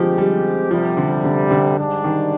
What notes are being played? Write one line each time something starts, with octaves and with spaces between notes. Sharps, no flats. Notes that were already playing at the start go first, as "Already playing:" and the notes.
Already playing: D3 F3 G3 G#3 C4 G4
G3
D2 C3 F3 G3
D3
D3
D3
G#2 G3 D4
D#3